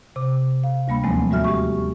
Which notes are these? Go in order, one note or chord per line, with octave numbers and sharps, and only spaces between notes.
C3 D6
F5
D2 G3 A#3 B5
D#2 F3 F#3 G#3 A3 C4
A2 G3 F#4 E5 F6
G4 C#6